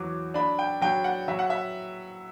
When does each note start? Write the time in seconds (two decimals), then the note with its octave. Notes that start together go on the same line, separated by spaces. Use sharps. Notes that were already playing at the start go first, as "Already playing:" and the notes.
Already playing: E2 F#3 D6
0.34 D4 B5
0.59 G5
0.81 F#3 G5
1.04 F#5
1.28 F#3 E5
1.39 F#5
1.50 E5